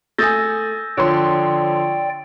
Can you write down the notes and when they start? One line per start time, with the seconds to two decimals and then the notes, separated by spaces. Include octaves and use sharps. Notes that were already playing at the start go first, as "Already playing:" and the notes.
0.18 A3 G#5 D#6 E6 G6 A6 A#6
0.97 D3 F3 C#5 D5 G5 C6